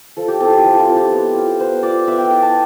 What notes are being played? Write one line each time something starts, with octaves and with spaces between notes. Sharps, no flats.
F3 A4
G4
C4 E4 A4
G4
F3
F4
C4 E4
G4
B3
F4
B3 C5
F4 D5
B3 E5
G5
E4 G5
A5